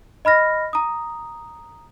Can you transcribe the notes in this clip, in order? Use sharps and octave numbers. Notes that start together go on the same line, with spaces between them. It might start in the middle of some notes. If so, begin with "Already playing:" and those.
D#5 B5 F6 A#6
A#5 D#6